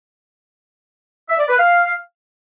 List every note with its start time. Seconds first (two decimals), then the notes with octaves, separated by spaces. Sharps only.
1.29 E5
1.39 D5
1.49 B4
1.59 F5